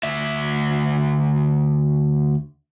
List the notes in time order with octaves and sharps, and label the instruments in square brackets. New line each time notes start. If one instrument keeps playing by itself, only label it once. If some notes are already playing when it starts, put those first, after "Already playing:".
[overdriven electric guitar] D2 E5